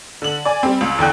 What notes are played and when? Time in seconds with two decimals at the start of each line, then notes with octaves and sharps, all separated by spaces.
0.22 D3 F#7
0.45 D5 G#5
0.63 G3 C4
0.81 C#2
0.99 E2 D3 G5 F#6